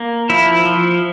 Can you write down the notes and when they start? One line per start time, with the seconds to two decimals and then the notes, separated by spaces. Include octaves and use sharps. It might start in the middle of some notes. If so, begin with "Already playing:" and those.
Already playing: A#3
0.29 F3 E4
0.65 F3